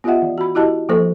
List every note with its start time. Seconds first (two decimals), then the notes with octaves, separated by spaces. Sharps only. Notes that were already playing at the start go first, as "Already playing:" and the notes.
0.04 B3 F4 G4 D#5 E5 F#5
0.22 E3
0.38 F#4 B5
0.55 E4 F#4 G4 D#5 A5
0.89 F3 A#3 A4 C5 C#6